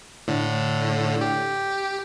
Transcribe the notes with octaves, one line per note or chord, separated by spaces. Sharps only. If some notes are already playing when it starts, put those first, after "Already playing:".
A2 D3
G4